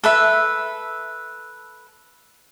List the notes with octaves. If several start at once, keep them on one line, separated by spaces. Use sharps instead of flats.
A4 B4 E5